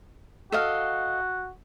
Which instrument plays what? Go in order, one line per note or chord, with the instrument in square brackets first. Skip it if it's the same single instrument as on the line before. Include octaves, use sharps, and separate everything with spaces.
[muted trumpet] F#4 [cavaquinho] A4 D#5 F5